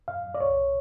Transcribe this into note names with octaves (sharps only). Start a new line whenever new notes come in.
F#2 F5
F#2
D5
C2 C#5